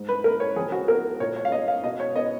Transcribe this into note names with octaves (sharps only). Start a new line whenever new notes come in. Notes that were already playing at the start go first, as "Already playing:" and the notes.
Already playing: G#2
B4
A#3 A#4
C#5
F2 G#4
F#4
B3 A#4
A#2 C#5
C#5
F5
B3 D#5
F5
B2 D#5
C#5
B3 D#5